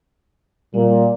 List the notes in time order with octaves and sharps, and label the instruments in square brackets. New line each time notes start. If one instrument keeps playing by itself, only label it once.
[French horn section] A#2 [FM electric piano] G3